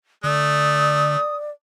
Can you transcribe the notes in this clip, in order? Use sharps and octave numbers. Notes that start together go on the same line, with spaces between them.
D3 A3 D5 D#6